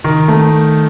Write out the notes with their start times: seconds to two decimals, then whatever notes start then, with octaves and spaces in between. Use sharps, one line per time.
0.04 D#3
0.28 A3